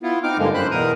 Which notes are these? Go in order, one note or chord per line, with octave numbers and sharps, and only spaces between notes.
B3 E4 F4
C4 D#4 D6 F6
G2 D3 F3 G#3 A#3
F#2 C5 B5 F#6
E2 B2 A#4 A#5 D#6